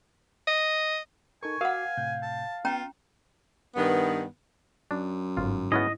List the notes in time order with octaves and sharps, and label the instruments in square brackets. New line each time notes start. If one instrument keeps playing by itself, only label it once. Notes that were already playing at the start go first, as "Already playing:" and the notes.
[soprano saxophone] D#5
[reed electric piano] D#4 A4 A#4 [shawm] G#5 [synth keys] C#6
[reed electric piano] F#4 D6 [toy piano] A#4 F#5 [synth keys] F5
[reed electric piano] A2 C3 G6
[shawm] A5
[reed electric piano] B3 [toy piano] C#4 G5 A#5 [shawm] F4
[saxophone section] G2 D#3 B3
[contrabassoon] F#2 [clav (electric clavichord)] D4
[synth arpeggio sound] G1 G#2 [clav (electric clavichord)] F4
[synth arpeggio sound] G#2 E4 [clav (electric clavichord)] B3 C#4 G#4 [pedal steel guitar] D#5